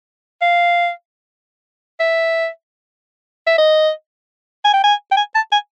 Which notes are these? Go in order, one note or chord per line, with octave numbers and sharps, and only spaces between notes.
F5
E5
E5
D#5
G#5
G5
G#5
G5
G#5
A5
G#5